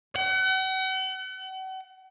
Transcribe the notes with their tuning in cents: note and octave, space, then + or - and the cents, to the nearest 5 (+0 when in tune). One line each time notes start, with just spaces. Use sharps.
F#5 +40